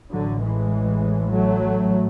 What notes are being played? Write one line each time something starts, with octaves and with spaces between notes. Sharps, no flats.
A1 A2 D3 F#3
E3 G#3
F#3 A3